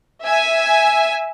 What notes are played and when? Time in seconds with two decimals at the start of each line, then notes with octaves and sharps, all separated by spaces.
0.24 E5 G#5